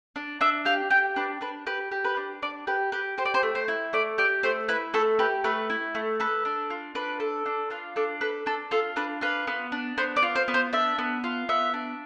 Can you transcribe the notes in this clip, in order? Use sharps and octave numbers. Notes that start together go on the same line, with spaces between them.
D4
D4 E5
G4 F5
G4 G5
D4 B4
D4 B4
G4 B4
G4
B4
D4
D4 D5
G4 B4
G4 B4
G4 C5
D5
C5
A3
C5
E4
A3 D5
G4 D5
A3 C5
E4 B4
A3 A4
G4 B4
A3 B4
E4
A3
A4 B4
D4
F4
D4 B4
A4
D4
F4 B4
D4 A4
A4 B4
D4 A4
F4 A4
D4 B4
F4 B4
B3
D4
B3 C5
D5
F4
C5
B3
C5
D4 E5
B3
F4
B3 E5
D4